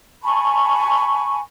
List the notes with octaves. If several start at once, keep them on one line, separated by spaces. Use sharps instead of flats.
G#5 A5 B5 C#6